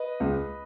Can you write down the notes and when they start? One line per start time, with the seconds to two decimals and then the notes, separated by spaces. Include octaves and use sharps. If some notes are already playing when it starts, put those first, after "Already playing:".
Already playing: B4 D#5
0.20 C#2